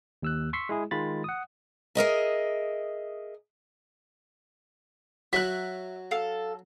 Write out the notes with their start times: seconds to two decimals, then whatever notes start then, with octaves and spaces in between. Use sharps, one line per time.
0.22 D#2 E6 F#6
0.53 C6 C#6 E6 B6 C7
0.69 G#3 E4 G#4
0.91 D#3 G#3 F4 B5 A6
1.24 F#5 D#6
1.95 G#4 A#4 D#5 E5
5.33 F#3 E5 F#6
6.11 A4 F5